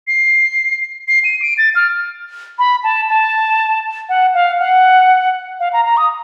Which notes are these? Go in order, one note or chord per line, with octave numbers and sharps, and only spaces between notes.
C7
C7
D#7
D7
A6
F6
B5
A5
A5
F#5
F5
F#5
F5
A#5
A#5
D#6